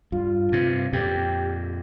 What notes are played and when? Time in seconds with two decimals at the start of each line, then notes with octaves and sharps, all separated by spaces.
0.12 G2 F4
0.52 G2 C3
0.93 F2 A#2 G4